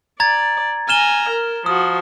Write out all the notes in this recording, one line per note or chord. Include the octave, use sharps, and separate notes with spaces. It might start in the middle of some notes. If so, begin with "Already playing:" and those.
D5 A#5 G#6 A6
G#5 A#5 F6 E7 G7
A#4
F3 F#4 D#6